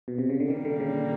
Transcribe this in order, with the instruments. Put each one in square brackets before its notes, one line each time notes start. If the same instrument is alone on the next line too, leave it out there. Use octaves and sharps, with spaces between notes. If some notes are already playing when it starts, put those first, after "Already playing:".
[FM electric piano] B2
C3
C#3
D3
[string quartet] A#2 G3 A#3 [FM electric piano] D#3
[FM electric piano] D3
C#3